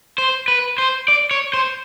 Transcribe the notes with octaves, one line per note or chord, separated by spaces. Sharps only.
C5
B4
C5
D5
C#5
C5